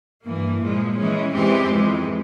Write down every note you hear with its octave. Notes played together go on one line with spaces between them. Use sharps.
G2 E3 A#3
A#2 F3 G#3
E3 G#3 C#4
E2 E3 G#3 C4 G4
F2 E3 G#3